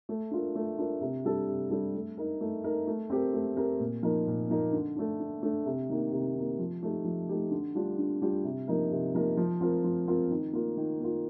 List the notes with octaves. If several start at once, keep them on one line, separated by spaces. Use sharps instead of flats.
A3
D4 F4 A#4
A3
D4 F4 A#4
C3
G3 D4 A4
C3
G3 D4 A4
A3
D#4 A#4
A3
D#4 A#4
A3
C4 G4 A#4
A3
C4 G4 A#4
A#2
F3 A#3 D#4 A#4
A#2
F3 A#3 D#4 A#4
D3
A3 D4
D3
A3 D4
C3
D#3 A#3
C3
D#3 A#3
F3
A3 D#4 G4
F3
A3 D#4 G4
D3
G3 D4 F4
D3
G3 D4 F4
C3
F3 A#3 D#4 A#4
C3
F3 A#3 D#4 A#4
F3
C4 F4 A#4
F3
C4 F4 A#4
D#3
A#3 F4
D#3
A#3 F4